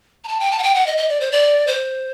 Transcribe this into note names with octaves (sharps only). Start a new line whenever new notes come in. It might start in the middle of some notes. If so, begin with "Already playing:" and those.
A#5
A5
G5
A5
F#5
G5
F#5
D#5
D#5
D5
C5
D5
C5